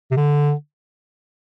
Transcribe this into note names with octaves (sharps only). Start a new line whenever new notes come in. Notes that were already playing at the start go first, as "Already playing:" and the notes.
C3
D3